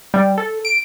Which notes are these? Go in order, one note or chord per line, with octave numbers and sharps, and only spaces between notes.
G3
A4
D7